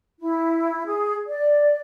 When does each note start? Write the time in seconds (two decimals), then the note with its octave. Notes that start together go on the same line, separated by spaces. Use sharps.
0.21 E4
0.86 G#4
1.26 D5